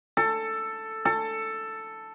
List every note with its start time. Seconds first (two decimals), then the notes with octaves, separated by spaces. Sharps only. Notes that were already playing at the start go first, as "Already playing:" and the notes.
0.17 A4
1.05 A4